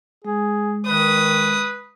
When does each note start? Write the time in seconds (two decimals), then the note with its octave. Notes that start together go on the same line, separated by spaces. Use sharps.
0.25 G#3 G#4
0.86 D#3 B4 D#6